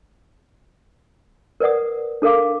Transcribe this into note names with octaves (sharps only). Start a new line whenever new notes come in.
A#4 B4 D5 F#5 D#6
D4 A4 A#4 F5 D6